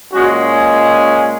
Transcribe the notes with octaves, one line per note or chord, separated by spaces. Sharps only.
A#2 G#3 C#4 F#4